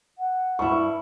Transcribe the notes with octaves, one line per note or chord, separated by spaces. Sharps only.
F#5
G2 E4 C#6